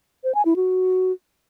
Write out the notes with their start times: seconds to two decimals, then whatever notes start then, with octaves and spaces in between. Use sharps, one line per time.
0.24 C5
0.35 G#5
0.45 E4
0.56 F#4